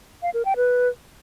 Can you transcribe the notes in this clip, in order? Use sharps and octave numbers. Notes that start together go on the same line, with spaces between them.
F5
A#4
G5
B4